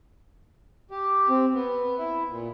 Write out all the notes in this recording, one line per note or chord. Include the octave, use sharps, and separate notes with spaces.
G4
C4
B3
E4
A#2